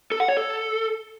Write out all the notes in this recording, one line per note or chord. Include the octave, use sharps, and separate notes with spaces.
A4
F#5
C#5
A4